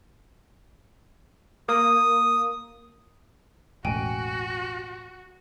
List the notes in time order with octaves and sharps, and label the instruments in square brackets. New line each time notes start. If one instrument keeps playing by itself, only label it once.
[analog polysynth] A#3 [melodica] D#6
[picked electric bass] E1 A1 [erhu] F#4 [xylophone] G5 G#5